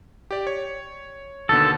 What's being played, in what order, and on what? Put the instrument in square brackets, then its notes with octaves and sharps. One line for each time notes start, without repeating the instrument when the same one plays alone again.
[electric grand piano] G4 D5
C#5
[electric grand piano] D#2 B2 D3 [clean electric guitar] A4